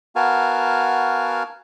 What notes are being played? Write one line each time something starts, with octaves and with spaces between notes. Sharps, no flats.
B3 F#4 A#4 F5 G#5 A5